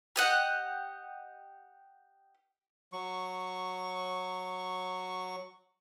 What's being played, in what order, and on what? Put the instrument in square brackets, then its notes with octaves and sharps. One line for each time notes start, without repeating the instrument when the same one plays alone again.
[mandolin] G4 D#5 F#5
[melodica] F#3 C#6